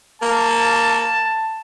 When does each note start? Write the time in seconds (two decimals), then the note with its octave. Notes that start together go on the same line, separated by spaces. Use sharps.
0.22 A#3 A5